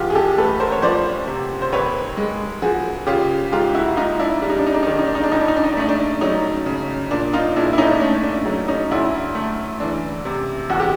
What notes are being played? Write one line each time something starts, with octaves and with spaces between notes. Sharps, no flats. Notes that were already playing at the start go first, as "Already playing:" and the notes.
Already playing: E2 F4 G4
G#4
G4 A4
A3 A4 B4
A#4 C5
C#5
F3 C5 D5
C3
C5
D#2 B4 C#5
G#3
F3 F#4 G#4
C#3 F4 G4
G#2 F4 G4
E4 F#4
G#2 D#4 F4
D4 E4
G3 D4
D#4
D4
D#4
D4
D#4
D#3 D4
D#4
D4
D#4
D4
F2 D#4
D4
D#4
D4
D#4
D4
A3 D#4
D4
F#3 C#4 D#4
C#3
A#2 D4
D#4 F4
A#2 D4 E4
E4
C#4 D#4
D4
A3 C#4
D4
F#3
C#4 D#4
D2 D4 E4
A3
E3 D4
C3
E2 F#4
G4